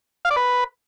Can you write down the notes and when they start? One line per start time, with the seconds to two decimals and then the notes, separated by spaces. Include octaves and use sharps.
0.25 F5
0.30 D5
0.36 B4